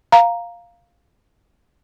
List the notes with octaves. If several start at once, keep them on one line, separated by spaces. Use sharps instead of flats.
F5 A#5